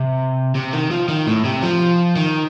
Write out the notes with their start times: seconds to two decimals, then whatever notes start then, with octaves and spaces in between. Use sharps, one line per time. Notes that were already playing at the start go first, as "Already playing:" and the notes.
Already playing: C3
0.55 C3
0.73 D#3
0.91 F3
1.09 D#3
1.27 A2
1.44 C3
1.63 F3
2.16 D#3